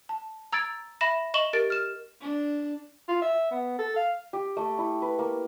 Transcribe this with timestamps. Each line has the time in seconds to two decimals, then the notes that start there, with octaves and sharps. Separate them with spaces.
0.09 A5
0.52 A#5 E6 G#6 A6 D7
1.01 E5 B5 A#6 E7
1.34 D#5 C#6 E7 F#7 G7
1.53 G4 A#4 A6 D7
1.70 F6 E7
2.20 D4
3.08 F4
3.22 E5
3.51 B3
3.79 A4
3.96 F5
4.33 G4
4.57 A3
4.78 E4
5.02 B4
5.19 A#3